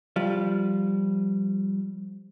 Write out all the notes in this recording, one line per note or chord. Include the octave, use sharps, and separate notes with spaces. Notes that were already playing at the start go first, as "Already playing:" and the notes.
F3 G3 F4